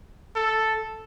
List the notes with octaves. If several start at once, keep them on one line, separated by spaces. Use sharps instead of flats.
A4